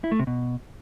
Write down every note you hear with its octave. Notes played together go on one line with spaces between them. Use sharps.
E4
A3
C3
B2